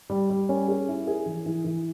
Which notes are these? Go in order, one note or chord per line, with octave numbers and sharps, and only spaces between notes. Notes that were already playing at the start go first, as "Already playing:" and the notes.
G3
G3
C#4
G#4
E4
G#4
E3
E3
E3